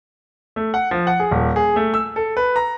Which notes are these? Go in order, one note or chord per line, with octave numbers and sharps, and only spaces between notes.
A3
F#5
F3
F#5
G#4
D#1
G#4
A3
E6
A4
B4
A#5